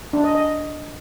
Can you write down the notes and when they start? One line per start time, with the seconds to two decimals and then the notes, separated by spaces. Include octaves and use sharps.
0.13 D4
0.24 D#5
0.35 D#5